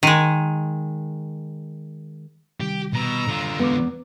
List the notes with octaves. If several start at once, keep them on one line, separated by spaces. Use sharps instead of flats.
D#3 G#3
C3 D#3 G3 G4
B2 A#5 E6
D3 F4
E2 G#3 B3 D6